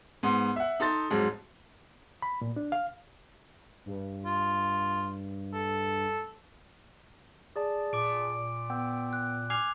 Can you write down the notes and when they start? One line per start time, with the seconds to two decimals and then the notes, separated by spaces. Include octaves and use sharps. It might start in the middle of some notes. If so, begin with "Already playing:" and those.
0.23 G#2 B3 C6
0.56 E5 F#5
0.80 D#4 A4 C6 A6
1.10 F2 G#2 F#3 G#3
2.22 B5
2.41 A#2
2.56 D4
2.72 F5
3.86 G2
4.25 F4
5.54 A4
7.56 G#4 D5 A5
7.93 A#2 D6 D7
8.70 B3 G5 E6
9.13 F#6
9.50 G#5 D6 F6 G#6 C7 F7